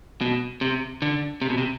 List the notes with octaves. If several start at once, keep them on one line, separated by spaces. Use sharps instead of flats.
B2
C3
D3
C3
B2
C3